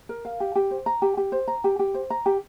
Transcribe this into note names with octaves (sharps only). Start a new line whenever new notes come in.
A#4
F5
G4
G4
C5
A#5
G4
G4
C5
A#5
G4
G4
C5
A#5
G4